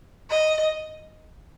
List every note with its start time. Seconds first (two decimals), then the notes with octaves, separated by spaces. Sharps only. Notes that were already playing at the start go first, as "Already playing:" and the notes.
0.30 D#5